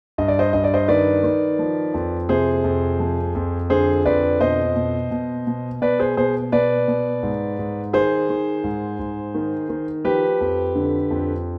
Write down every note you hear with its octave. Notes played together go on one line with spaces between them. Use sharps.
G2 D#5
D5
C5 D#5
G2 D#5
D5
C5 D#5
D#3 B4 D5
D#3
F3
F2
C3 G#4 C5
F2
F3
F2
D3 G#4 C5
F2 B4 D5
B2 C5 D#5
B2
B2
B2
B2 B4 D5
G#4 C5
B2 G#4 C5
B2 B4 D5
B2
G#2
G#2
D#3 G#4 C5
D#3
G#2
G#2
D#3
D#3
F3 G4 B4
F2
D3
F2